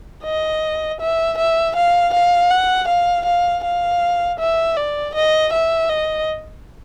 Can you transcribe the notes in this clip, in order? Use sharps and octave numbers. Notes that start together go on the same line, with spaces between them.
D#5
E5
E5
F5
F5
F#5
F5
F5
F5
E5
D5
D#5
E5
D#5